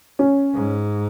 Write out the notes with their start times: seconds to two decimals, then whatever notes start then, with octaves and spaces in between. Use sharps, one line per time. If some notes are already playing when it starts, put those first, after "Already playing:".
0.19 C#4
0.54 G#2